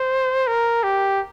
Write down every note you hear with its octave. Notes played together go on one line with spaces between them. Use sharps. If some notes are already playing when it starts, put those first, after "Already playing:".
Already playing: C5
A#4
G4